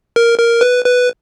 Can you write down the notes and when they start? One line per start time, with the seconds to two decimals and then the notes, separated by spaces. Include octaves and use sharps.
0.16 A#4
0.38 A#4
0.61 B4
0.85 B4